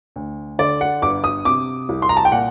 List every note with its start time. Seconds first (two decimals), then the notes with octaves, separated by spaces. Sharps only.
0.16 D2
0.59 D3 D5
0.81 F#5
1.02 G1 D6
1.24 D#6
1.45 C3 D6
1.89 C2
2.02 C6
2.09 A#5
2.17 A5
2.25 G5
2.32 A#2 F#5